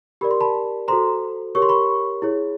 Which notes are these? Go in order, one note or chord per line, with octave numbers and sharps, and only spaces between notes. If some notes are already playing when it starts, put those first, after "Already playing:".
G4 A#4 D5 B5
C6
A5 B5
F#4 A4 C5 A#5 C6
G4 A#4 C#5 C#6
C6
B5 C#6
E4 G#4 C#5